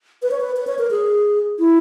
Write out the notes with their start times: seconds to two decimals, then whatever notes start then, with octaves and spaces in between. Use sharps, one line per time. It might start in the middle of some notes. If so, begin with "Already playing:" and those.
0.22 B4
0.31 C#5
0.41 B4
0.57 B4
0.67 C#5
0.79 A#4
0.91 G#4
1.59 E4